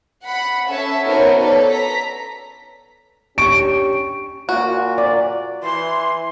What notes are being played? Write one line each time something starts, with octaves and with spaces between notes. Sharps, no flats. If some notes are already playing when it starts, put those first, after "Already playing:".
F#5 B5
C#4 A4 C#5 E5 A5
B3 D#4 F#4 A#4 C5 C#5
A4 B4 C#5 D5
A#5 B6
C#4 D4 G4 C#6 D7
A#2 F#4
D5
E3 C6